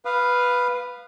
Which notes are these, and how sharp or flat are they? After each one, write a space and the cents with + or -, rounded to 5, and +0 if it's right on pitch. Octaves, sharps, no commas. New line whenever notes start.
B4 +0 F5 +0 D#6 -35